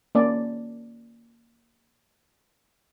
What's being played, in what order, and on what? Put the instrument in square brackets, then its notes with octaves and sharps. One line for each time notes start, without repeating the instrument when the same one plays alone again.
[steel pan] A#3 C#4 D5